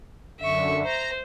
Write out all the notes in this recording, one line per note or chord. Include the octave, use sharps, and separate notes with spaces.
F#2 D3 E5 C#6
C5 A#5